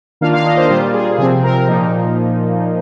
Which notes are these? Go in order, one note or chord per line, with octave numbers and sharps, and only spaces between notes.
D#3 A#3 D4 F4 F5
F5
D#5
C5
A#2 G3 A#3 F4 C5
G#4
C3 F3 C4 G#4
A#4
A#2 F3 A#3 D#4